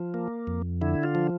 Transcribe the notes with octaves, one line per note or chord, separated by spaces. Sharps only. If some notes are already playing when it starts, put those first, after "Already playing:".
Already playing: F3
A#3
F2
D3 E4
F4
F3